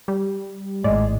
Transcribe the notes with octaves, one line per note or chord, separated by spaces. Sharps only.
G3
G#1 A2 G#3 D5